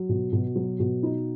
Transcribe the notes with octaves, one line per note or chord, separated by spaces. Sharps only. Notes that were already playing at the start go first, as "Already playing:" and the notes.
Already playing: F#3
B2
B2
F#3
B2
D#4